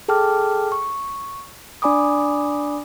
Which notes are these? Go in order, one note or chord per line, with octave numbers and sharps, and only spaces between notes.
G#4 A4 G5 A5 D6 F6
C#6
D4 D5 G#5 B5 D6 D#6